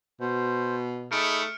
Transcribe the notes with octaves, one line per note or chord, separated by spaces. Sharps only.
B2 C5
A3 D#4 G#4 B5 F6 C#7 D7